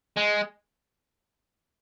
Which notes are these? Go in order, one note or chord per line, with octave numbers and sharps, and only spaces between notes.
G#3